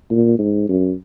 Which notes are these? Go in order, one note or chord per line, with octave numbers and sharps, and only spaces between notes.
A#2
G#2
F#2